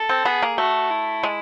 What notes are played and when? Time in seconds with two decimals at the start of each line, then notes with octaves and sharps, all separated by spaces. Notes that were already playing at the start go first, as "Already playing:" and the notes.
Already playing: A4
0.09 C4
0.25 B3 G#4
0.42 A#3
0.58 A3 F#4
0.90 E4
1.23 G#3